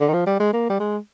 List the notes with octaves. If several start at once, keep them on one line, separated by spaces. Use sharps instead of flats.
D3
D#3
F3
G3
G#3
A#3
G3
G#3